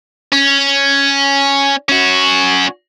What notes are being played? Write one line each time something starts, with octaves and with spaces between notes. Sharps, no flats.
C#4
C#4 F#4